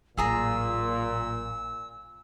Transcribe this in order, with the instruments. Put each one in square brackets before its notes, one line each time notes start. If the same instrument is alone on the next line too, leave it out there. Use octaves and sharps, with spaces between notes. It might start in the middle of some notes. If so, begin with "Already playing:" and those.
[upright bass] A1 F#3 [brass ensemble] A#2 [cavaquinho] F4 G#4 A#5 [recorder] E6